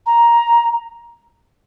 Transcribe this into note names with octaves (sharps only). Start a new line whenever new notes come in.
A#5